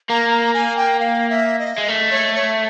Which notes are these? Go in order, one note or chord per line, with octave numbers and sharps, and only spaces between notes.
A#3 A#5
A#5
G#5
G5
F5
E5
D#5
G#3
A3
C#5
C#5